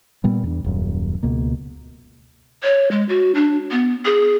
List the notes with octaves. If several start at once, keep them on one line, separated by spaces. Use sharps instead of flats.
A#2 G3 B3
E2 D4
D#1 F#2
C#2 B2 A#3
C#5
G#3
F#4
D4
B3
G#4